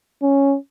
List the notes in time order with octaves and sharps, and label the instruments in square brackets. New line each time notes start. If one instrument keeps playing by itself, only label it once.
[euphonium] C#4